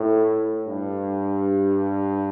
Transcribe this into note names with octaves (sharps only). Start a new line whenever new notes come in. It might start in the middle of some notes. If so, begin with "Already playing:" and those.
Already playing: A2
G2